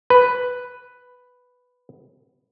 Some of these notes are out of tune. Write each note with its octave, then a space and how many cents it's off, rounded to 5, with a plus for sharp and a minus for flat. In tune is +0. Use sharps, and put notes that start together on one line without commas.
B4 +5